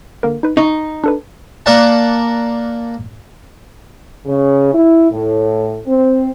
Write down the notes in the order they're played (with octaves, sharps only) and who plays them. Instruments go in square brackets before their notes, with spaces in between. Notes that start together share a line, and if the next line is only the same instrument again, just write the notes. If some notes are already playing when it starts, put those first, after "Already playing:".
[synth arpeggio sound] D3 A#3 A#4
D#4 B4
[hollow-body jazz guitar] D#4 [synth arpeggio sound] C#6
[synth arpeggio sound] D4 A4 B4
[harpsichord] A#3 A#4 D5 F5 F#5 A5
[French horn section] C#3
E4
A2
C4